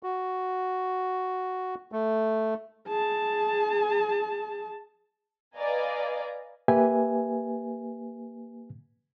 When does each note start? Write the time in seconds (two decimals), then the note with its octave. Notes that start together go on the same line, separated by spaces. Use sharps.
0.03 F#4
1.92 A3
2.88 G#4 A5
5.56 B4 D5 D#5 F5 G#5 A#5
6.68 A#3 G4 B4 E5 G#5